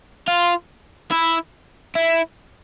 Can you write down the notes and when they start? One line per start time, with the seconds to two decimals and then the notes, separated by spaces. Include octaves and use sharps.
0.28 F4
1.12 E4
1.95 E4